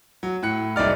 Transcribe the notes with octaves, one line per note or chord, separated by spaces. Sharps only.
F#3
A2 F#6 C#7
F#1 C2 D#4 D5 F6